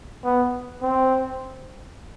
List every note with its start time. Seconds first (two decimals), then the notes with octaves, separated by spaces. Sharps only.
0.24 B3
0.82 C4